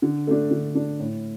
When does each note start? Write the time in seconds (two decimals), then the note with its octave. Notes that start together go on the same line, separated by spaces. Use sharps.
0.02 D3
0.27 A3 D4
0.51 D3
0.75 A3 D4
1.00 A2